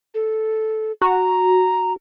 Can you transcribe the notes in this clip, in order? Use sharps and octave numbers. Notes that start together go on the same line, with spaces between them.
A4
F#4 A#5